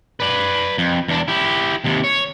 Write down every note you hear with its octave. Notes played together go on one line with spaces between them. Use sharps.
B4 D5
F2
E2 D4
E4 G4
D#2 C3
C#5